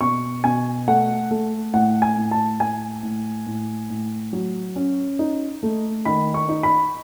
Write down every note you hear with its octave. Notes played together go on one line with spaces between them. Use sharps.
B2 C#6
B2 G#5
A3 F#5
A3
A2 F#5
G#5
A2
A5
A2 G#5
A2
A2
A2
F#3
C#4
D#4
A3
D#3 B5
C#6
D#4
B5